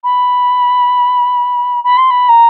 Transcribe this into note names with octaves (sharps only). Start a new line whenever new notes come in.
B5
B5
C6
B5
A#5